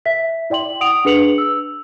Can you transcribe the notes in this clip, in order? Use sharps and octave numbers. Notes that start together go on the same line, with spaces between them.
E5 B6
E4 D5 G5 C6 F#7
F#5 D#6 D7 F7
D4 G#4 B4 C#7 F7 F#7
E6